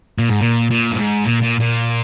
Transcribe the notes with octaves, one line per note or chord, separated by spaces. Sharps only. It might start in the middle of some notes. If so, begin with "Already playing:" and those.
A#2
G#2
A#2
A#2
G2
G#2
A#2
A#2
A#2